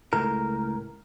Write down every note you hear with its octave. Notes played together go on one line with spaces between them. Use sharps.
C#2 A2 A#4